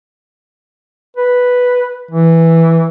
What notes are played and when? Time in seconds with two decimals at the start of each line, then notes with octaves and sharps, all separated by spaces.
1.17 B4
2.11 E3